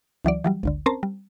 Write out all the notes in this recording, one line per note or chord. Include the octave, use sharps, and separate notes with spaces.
C#2 E3 F#3 D5
E3 F#3 G3
G#1 D2 D3
C4 C#4 A#4 C5 A5 A#5
G3